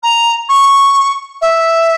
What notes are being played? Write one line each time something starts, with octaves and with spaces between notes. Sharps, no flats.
A#5
C#6
E5